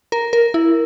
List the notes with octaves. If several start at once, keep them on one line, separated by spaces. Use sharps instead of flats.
A#4
A#4
E4